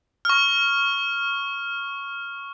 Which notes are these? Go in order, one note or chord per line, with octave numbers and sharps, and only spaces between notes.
C#6 F6